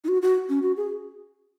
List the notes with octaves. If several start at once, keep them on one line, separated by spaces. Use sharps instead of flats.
D#4
F#4
F#4
C#4
F#4
G#4